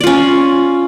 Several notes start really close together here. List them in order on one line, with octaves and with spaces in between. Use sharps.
D5 F4 C#4